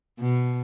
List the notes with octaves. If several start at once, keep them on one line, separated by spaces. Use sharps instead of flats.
B2